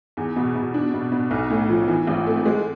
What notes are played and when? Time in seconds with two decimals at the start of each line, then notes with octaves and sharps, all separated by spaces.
0.17 E2
0.36 B2
0.55 B2
0.74 D4
0.94 B2
1.12 B2
1.31 B1
1.50 A2
1.69 F3
1.88 E3
2.07 G#1
2.26 A3
2.46 G#3